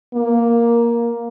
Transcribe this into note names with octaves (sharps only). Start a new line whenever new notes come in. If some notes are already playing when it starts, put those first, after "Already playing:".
A#3